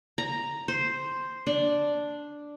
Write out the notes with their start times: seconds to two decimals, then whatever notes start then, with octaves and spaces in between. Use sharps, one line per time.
0.18 A#5
0.68 C5
1.47 D4